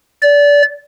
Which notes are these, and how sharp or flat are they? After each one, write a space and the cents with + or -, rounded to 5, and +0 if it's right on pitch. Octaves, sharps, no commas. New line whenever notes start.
D5 -25